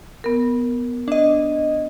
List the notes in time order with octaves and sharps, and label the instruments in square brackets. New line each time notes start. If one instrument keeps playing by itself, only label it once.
[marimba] B3 A#4
[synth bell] D4 D#5